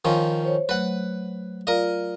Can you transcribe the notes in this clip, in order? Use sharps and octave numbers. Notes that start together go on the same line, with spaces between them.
D#3 F3 C#4
C5 C#5
F#3 A3 B4 F#5
F4 A#4 D5 D#5 F5